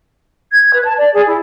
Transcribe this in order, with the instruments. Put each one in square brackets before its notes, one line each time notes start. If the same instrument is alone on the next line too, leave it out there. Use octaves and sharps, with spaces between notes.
[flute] G#6
B4
A5
D5
G#4
E4